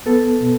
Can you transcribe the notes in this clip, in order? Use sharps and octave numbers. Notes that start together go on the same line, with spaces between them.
B3 A4 A5
B2